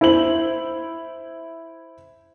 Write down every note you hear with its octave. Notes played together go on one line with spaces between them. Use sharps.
E4 C5 F#7